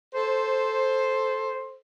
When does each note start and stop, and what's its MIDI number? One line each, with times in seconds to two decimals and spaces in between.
0.15 1.77 69
0.15 1.77 72